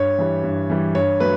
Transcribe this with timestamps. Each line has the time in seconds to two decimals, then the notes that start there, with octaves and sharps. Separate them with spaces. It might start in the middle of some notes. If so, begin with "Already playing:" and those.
Already playing: G2 C#5
0.19 E3 G3
0.43 G2
0.70 E3 G3
0.95 G2 C#5
1.20 F#3 A3 B4